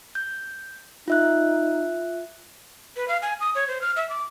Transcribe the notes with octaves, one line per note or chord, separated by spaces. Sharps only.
G6
D#4 F4 E5 F#6
B4
F5
G#5
D#6
C#5
C5
F6
E5
D6